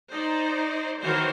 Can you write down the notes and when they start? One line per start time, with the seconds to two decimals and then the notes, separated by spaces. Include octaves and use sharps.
0.12 D#4 C5 D5
1.01 D#3 E3 F#4 C5 C#5